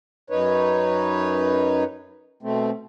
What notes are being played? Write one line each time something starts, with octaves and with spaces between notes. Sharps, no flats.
F#2 D#4 B4 C#5
B2 A3 C4